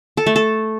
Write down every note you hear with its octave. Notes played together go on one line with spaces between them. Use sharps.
A4
A3
A4